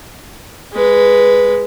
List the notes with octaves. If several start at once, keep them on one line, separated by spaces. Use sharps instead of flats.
G#3 B4